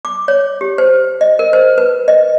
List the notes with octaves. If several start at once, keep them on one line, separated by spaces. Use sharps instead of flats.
D6
C#5
G4
C5
D#5
A#4
C5
B4
D#5